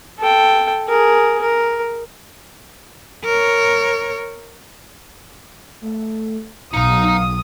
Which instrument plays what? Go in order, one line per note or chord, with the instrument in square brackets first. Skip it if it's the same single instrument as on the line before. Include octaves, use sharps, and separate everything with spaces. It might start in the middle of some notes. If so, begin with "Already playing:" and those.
[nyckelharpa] A4 G5
G#4 A#4
A#4
[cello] A#4 C#5
[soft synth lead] A3
[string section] B1 [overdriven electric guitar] D#4 A#5 [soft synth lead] F5 [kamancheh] D#6